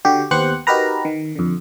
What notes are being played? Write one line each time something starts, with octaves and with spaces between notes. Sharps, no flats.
D3 F#4 G4
D#2 B3 G4 C5 F#6 C#7
D#4 F#4 G4 A#4 B4 A#5
D#3
F2 D3